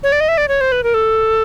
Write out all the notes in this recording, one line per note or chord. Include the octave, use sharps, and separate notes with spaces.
C#5
D5
D#5
E5
D5
C#5
C5
B4
A#4
A4